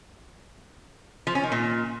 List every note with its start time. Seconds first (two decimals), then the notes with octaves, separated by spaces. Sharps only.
1.27 F3
1.35 C#4
1.43 D#3
1.52 A#2